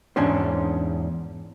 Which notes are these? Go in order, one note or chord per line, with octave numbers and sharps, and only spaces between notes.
E2 G#2 C#4 D4 C5